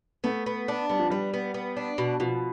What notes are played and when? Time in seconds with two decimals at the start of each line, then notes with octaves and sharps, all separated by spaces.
0.24 A3 B3
0.46 B3
0.68 D4
0.90 G3 B3
1.00 F3
1.10 G3 B3
1.34 B3
1.54 B3
1.77 D4
1.98 B2
2.20 B2 F3